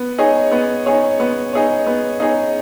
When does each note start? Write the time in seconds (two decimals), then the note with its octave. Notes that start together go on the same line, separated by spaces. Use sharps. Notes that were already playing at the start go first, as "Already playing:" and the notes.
Already playing: B3
0.18 D#4 G#4 C#5
0.51 B3
0.86 D#4 G#4 C#5
1.20 B3
1.53 D#4 G#4 C#5
1.87 B3
2.20 D#4 G#4 C#5